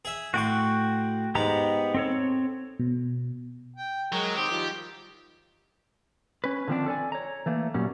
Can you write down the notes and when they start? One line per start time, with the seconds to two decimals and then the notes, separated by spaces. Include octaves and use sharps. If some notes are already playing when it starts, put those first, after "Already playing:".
0.05 G#4 E5
0.34 A2 F#4 G5 C6 C#6
1.35 G#2 G#3 B3 G4 A#5
1.95 C4 A4 C#5
2.79 B2
3.76 G5
4.13 F#3 G#3 A#4
4.37 D#3 C4 G4 D#6
4.51 D#3 F3 G3
6.44 C#4 B4
6.68 D3 D#3 F3 A#3 C4 D4
6.86 A4 D5 G#5
7.12 C#5 A#5
7.46 E3 A3 A#3
7.74 A#2 F#3 G3 C#4